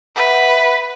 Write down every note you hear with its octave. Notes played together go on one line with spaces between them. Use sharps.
B4 E5 F#5